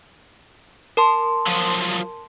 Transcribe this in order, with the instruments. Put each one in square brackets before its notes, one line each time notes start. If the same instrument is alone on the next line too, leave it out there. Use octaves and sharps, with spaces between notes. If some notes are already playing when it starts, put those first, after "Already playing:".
[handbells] A#4 A5 C6
[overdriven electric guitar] F3 F#3